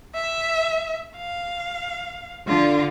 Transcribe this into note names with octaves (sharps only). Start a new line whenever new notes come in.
E5
F5
D3 F4